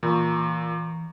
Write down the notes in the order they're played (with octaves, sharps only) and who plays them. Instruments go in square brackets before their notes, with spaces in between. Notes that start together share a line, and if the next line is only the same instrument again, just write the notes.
[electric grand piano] A#2 [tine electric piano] E3 [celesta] A#5 B5 C#6